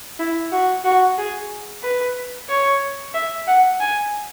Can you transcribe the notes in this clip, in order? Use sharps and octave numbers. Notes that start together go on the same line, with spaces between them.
E4
F#4
F#4
G#4
B4
C#5
E5
F#5
G#5